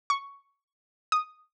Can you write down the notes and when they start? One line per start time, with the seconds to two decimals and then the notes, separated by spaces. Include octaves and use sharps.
0.10 C#6
1.12 D#6